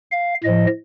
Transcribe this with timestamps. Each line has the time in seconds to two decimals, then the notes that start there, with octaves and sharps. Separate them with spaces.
0.11 F5
0.44 A2 F3 D#5